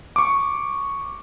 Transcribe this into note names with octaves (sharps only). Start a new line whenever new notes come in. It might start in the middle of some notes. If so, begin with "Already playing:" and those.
C#6 D6